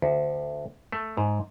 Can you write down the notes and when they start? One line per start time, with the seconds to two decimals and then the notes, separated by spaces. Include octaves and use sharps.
0.02 D2
0.92 A3
1.17 G#2